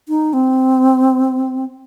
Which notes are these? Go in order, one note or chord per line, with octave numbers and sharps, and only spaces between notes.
D#4
C4